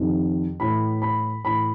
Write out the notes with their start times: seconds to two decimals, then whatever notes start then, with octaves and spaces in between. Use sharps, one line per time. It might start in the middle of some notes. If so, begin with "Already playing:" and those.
Already playing: F2 C3 D#3
0.60 A2 E3 B5
1.02 B5
1.44 A2 E3 B5